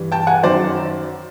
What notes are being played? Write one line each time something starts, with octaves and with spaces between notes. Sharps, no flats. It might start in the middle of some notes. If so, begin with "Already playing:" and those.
Already playing: G2 E3 G3
G5 A5
F#5 G#5
F#2 D#3 F#3 C5 D5